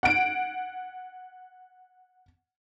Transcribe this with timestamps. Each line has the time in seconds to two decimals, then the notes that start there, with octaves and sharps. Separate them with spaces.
0.03 F#5 D7